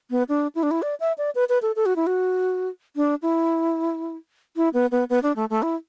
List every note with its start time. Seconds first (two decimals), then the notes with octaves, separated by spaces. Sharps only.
0.11 B3
0.29 D4
0.55 E4
0.63 D4
0.71 E4
0.82 D5
1.00 E5
1.18 D5
1.35 B4
1.49 B4
1.62 A4
1.76 A4
1.86 F#4
1.96 E4
2.07 F#4
2.96 D4
3.22 E4
4.56 E4
4.74 B3
4.92 B3
5.10 B3
5.23 D4
5.36 A3
5.50 A3
5.63 E4